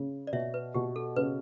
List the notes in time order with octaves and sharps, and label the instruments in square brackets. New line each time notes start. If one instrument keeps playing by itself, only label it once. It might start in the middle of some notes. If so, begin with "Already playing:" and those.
Already playing: [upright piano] C#3
[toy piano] D5
[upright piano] B2 [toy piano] C#5 E5
[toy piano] B4
[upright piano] B2 [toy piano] G4
[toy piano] A4
[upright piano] C#3 [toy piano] B4